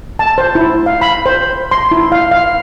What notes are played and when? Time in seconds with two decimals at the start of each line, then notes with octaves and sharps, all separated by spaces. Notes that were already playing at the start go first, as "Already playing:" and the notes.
0.19 A5
0.38 C5
0.55 E4
0.86 F5
1.01 B5
1.26 C5
1.71 C6
1.91 E4
2.12 F5
2.31 F5